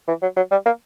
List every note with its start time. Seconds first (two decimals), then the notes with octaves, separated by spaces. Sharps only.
0.08 E3
0.22 F#3
0.37 F#3
0.52 G3
0.66 A#3